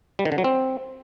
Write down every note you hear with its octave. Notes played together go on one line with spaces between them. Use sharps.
G3
D#3
D3
F#3
C4